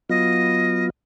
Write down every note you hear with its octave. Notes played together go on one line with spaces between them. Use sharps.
F#3 B3 F4 D#5